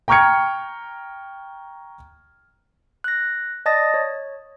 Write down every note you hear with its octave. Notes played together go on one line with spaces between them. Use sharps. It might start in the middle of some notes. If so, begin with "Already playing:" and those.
G5 A#5 C#6 F6 G#6 C#7
F#6 A#6
D5 D#5 A5 D#6 A6 A#6
C#5